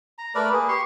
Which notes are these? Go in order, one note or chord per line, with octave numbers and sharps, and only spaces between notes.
A#5
A3 A#4 B4 D5
A#3 G#4 B4
G4 C6 C#6